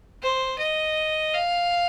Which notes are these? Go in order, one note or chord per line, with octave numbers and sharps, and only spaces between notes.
C5
D#5
F5